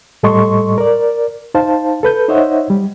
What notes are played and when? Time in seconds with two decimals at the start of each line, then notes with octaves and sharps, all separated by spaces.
0.23 A2 G3 A4 D#5 C6 C#6
0.78 A#4 D5
1.54 D#4 C5 F5 A5
2.03 A4 B4 G6
2.28 D#4 C5 C#5 D#5 E5 F#5
2.70 G3